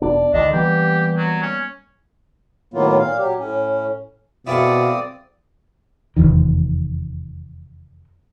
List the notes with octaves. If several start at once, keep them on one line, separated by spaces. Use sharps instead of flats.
E1 B3 D4 D5
C#2 D3 D#3 D4 D#5
E3 G3 A#3 B3 G4
F#3
C#4
A2 D#3 F#3 A#3 B3 F4
A#2 F5
F#3 G4
A2 C#4
B2 C4 E4 G#4 A4 D5 F5 D#6
F1 B1 E2 D#3